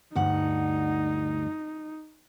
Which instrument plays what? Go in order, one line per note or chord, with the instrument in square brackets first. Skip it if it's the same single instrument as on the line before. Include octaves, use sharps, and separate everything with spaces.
[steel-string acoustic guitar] D2 G2 F#5 [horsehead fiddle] D#4